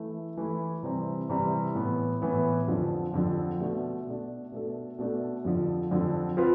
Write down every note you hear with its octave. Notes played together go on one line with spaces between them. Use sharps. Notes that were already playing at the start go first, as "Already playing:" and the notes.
Already playing: E3 A3 E4
E3 A3 E4
C3 E3 G3 C4
C3 E3 G3 C4
A2 E3 B3
A2 E3 B3
F2 D3 F3
F2 D3 F3
B2 A3 D4
B2 A3 D4
B2 A3 D4 A4
B2 A3 D4 A4
F2 D3 F3
F2 D3 F3
F3 C4 F4 B4